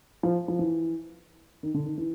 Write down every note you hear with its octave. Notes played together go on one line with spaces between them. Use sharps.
F3
F3
E3
D#3
D3
D#3
E3